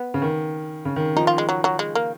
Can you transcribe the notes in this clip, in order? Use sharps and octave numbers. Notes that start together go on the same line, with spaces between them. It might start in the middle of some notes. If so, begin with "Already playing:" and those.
Already playing: B3
C#3
D#3
C#3
D#3
F3 D#4
F4
G#3
F#3
F#3
G#3
A#3